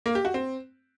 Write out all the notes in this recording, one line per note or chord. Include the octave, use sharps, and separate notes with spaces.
A#3
G4
F#4
C4